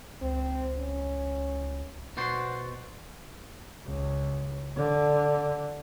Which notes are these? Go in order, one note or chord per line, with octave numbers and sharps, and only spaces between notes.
C#2 C4
C#4
B2 F#4 C5 D5 C6
C#2
D3